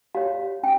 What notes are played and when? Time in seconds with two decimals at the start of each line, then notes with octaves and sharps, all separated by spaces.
0.15 G4 C#5 F5
0.63 C#4 G5